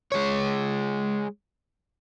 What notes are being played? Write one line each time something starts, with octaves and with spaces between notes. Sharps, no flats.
G#3 C#5